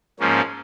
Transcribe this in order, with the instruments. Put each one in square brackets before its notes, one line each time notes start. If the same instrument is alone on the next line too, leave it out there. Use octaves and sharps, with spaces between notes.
[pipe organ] G#2 F3 A#3 C#4